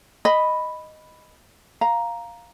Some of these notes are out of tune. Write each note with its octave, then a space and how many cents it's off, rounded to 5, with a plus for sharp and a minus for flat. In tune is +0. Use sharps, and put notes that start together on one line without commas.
D#5 +0 B5 +0
F5 +0 A#5 +5